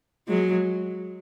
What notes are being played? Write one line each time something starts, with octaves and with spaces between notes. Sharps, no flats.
F#3 G#3